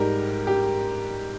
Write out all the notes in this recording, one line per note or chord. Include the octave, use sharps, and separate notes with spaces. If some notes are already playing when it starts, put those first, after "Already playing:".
Already playing: G#2 G3 G4 A#4
G4